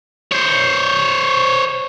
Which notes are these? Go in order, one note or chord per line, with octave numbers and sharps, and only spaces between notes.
C5 C#5